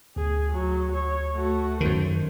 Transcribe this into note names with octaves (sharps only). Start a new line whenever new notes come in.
D2 G#4
F#3
C#5
A3 F#4
F#2 D#3 C5